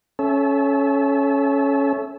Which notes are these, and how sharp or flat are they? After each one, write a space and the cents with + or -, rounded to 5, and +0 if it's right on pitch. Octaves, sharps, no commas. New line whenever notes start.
C#4 +0 A4 -35 E5 +0